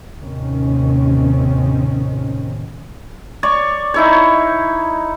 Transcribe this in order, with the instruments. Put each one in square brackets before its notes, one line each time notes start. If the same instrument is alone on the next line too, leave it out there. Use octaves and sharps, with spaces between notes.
[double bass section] D#2 A2 C3 D#3 C4 C#4
[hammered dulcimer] C#5 D5 C#6
D#4 E4 C#5